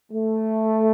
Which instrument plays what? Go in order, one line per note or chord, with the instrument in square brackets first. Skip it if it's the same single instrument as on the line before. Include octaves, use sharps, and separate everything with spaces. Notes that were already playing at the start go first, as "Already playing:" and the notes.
[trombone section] A3